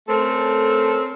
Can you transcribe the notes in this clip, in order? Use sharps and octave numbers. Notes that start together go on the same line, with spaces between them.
A3 C4 C#4 A4 A#4